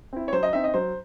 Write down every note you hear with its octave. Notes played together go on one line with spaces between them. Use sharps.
C4 E4
C#5
F#3 C5
D#5
C4 D#4 E5
D#5
F#3 C5